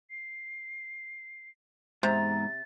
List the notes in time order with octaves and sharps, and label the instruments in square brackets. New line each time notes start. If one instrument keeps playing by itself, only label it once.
[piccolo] C7
[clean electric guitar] E2 A#5 [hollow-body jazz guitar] G#2 [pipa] C3 [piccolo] A6